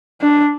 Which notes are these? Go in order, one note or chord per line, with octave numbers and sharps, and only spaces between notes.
D4